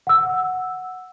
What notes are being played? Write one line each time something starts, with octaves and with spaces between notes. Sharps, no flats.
F#5 E6